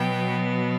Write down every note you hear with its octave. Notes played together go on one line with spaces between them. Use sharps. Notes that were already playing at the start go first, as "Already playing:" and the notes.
Already playing: B2 F#3 B3 G5